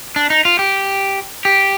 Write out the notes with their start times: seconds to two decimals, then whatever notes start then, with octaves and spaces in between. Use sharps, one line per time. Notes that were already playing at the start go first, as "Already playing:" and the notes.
0.16 D4
0.30 D#4
0.45 F4
0.59 G4
1.45 G4